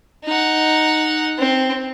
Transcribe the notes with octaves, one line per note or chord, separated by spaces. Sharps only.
D#4 F#5
C4